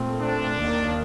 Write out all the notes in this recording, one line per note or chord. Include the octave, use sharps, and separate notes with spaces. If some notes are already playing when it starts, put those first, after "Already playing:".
Already playing: A#2 A3 C4
D4
D#2 D#3 A#3